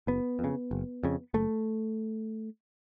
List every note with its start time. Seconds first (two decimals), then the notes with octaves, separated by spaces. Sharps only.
0.07 F#1 B3
0.39 F2
0.44 C#3
0.71 F#1
1.03 F2 C#3
1.34 F#1 A3